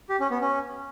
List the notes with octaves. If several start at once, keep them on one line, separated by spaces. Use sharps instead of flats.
G4
C#4
B3
C#4